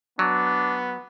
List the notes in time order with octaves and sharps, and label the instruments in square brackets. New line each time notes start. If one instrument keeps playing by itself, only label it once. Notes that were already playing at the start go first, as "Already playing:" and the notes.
[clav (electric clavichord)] F#3 [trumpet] B3 [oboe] D4